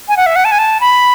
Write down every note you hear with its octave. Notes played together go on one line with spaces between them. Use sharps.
G#5
F#5
E5
F#5
A5
G#5
A5
B5